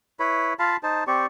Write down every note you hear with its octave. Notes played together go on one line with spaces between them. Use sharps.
E4 B4 C#5 B5
F4 F5 A5 B5
D#4 C5 A5
C4 G4 D5 C#6